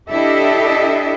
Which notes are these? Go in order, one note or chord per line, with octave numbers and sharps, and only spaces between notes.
D4 E4 G4 A4 D#5 E5